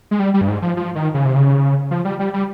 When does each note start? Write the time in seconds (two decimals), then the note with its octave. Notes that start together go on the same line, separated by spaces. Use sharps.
0.11 G#3
0.19 G3
0.34 G3
0.41 G2
0.48 G#2
0.62 F3
0.77 F3
0.95 D#3
1.14 C#3
1.25 C3
1.36 C#3
1.91 F3
2.05 G3
2.19 G3
2.34 G3